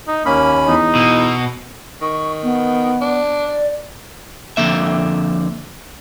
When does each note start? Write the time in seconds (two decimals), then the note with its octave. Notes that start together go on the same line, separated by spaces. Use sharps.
0.08 D#4
0.26 D#2 A#3 C#4 B5
0.68 E2 D#4
0.95 B2 E6
2.02 D#3 C#6
2.43 B3
3.01 D4
3.46 D5
4.57 F2 D3 A#3 E5